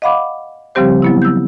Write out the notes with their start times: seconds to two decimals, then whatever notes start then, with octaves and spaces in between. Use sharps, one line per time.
0.02 D#5 F5 F#5 B5 D6
0.75 C#3 F3 G3 C4 G4 C5
1.02 F#3 B3 E4
1.22 E6 G6